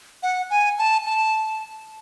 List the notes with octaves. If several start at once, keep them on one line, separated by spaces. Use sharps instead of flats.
F#5
G#5
A5
A5